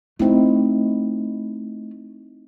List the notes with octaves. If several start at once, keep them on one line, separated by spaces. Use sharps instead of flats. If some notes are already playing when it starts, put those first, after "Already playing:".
A3 C4 D#4 E4